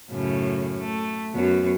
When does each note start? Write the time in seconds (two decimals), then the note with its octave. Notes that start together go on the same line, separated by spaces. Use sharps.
0.11 F#2 A2 C#3
0.80 A3
1.33 F#2 F#3 B3